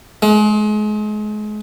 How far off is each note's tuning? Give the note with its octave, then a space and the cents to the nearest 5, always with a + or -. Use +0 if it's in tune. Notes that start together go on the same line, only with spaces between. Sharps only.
G#3 +35